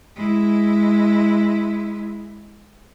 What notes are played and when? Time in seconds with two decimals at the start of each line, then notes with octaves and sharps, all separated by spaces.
0.16 G#3 E4